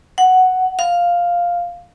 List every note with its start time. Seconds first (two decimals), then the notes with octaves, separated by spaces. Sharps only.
0.18 F#5
0.79 F5